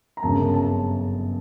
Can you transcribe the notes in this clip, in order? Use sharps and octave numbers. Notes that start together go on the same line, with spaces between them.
A#5
G1 F#2 C#3 A5
A5